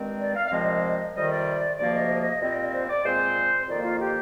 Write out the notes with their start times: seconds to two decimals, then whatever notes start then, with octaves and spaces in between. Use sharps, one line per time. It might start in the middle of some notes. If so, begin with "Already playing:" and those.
Already playing: G2 D#3 G#3 C4
0.20 D5
0.36 F5
0.47 F5
0.51 C2 A#2 F3 G#3 C4 D#5
1.15 F2 C3 D#3 G3 D#5
1.31 D5
1.78 D2 C3 F3 A#3 D5
1.94 D#5
2.42 A#2 G3 C4
2.73 C5
2.89 D5
3.05 A#2 G#3 C4 C5
3.68 F2 D#3 A#3 D5
3.83 F4
4.00 G4